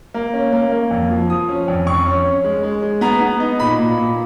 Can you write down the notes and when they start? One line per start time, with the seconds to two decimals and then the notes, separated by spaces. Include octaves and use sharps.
0.14 A#3
0.33 C#4
0.52 A#3
0.72 A#3
0.91 F2
1.11 F3
1.29 F3 D#6
1.49 C#4
1.68 F2
1.87 F2 C#6
2.05 C#4
2.25 C#4
2.44 G#3
2.63 G#3
2.82 G#3
3.01 B3 A#5
3.21 B3
3.40 D#4
3.60 A#2 B5
3.78 A#2
3.97 A#2